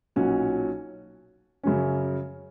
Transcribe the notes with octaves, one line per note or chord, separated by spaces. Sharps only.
B1 A#2 F#3 C#4 F#4
F#2 C#3 F#3 C#4